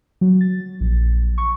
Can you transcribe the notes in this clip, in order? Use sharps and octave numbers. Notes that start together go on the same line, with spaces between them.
F#3
A6
A#1
C#6